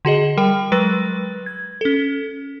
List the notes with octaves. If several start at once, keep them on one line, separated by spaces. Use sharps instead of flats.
D3 F#4 G#4 D#5
G3 A#4 G5
F#3 G#3 B4 A6 A#6
G#6
C#4 A4